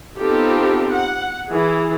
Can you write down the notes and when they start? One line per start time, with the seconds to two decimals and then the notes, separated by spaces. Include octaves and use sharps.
0.18 B3 C4 D#4 F4 G4 A4
0.93 F#5
1.47 E3 G#4